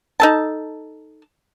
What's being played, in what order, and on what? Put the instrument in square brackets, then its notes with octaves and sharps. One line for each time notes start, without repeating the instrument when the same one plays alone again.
[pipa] D#4 A4 A5